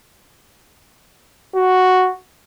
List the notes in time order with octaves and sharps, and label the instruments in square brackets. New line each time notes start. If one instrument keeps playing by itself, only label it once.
[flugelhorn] F#4